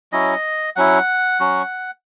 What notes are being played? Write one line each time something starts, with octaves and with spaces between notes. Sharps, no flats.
F#3 C#4 E4 D#5
F#3 C#4 E4 F#5
F#3 C#4 F#4